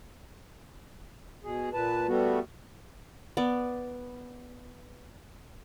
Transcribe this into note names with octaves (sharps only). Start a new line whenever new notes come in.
B2 G#4
A#2 B4 A5
G3 A3 B3 F#4
B3 D5